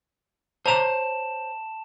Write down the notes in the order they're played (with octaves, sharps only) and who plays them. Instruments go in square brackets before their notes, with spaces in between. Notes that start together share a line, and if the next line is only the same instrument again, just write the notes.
[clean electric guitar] C5 C#5 A#5 [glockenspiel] A5 E7